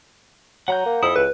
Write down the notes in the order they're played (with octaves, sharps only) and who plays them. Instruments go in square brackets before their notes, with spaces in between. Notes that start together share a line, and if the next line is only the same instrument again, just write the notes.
[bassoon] F#3 [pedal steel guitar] F#5 A#5 G6
[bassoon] A#3
[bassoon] F2 [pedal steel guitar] E4 A4 [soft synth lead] D#6
[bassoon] C#2 [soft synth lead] B4